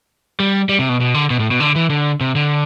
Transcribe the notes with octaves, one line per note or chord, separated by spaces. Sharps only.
G3
G3
C3
B2
B2
D3
B2
A2
B2
D3
E3
D3
C3
D3